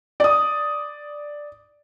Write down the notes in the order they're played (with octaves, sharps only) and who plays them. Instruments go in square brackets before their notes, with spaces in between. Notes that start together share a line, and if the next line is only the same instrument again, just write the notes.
[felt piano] D5 D#6